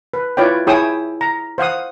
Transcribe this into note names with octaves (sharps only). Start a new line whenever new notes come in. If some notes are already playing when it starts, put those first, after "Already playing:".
B4
E4 F4 B4 C#5 D5 G5
E4 G#4 C#5 G5 D#6 E6
A#5
C5 F5 F#5 D#6